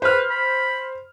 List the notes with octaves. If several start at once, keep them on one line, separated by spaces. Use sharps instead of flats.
B4 C5 F6
B5